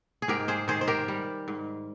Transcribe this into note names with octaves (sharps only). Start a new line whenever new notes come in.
G#4
G#2 G4 A#4
G#4 C5
D#3 G#4 C5
C5
G4 A#4
G3
G#2